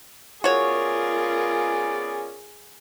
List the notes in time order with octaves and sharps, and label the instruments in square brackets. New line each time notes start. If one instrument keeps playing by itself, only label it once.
[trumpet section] B3 C#4 D5 [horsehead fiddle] F4 A#4 [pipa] F#4 C#5 [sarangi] G#4